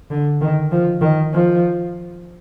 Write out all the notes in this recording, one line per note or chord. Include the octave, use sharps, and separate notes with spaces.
D3
D#3
F3
D#3
F3